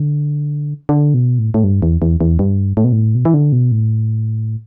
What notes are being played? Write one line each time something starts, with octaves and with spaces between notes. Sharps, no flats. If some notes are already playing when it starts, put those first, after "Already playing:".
Already playing: D3
D3
B2
A2
A2
G2
E2
E2
E2
G2
A2
B2
A2
B2
E3
D3
B2
A2